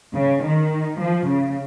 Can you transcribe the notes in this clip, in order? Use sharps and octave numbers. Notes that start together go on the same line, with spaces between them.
C#3
D#3
F3
C#3